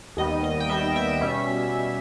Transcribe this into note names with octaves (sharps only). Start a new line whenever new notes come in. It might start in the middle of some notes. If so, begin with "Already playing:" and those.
D#2 D#3 G3 B3 D#5
D#5
G5
D#2 D#3 G3 B3 E5
E5
B2 G3 C#4